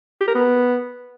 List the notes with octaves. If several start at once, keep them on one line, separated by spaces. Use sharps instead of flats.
G4
A#4
B3